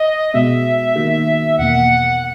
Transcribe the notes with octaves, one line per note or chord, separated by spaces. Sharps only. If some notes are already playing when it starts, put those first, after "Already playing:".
Already playing: D#5
B2 G#3 B3 F#4 E5
D#3 A#3 D#4 F#4
E2 B2 A#3 F#5